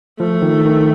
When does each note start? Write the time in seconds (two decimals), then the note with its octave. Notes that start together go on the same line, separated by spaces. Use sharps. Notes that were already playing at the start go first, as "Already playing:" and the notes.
0.20 F3 A3
0.42 D#3
0.65 D#3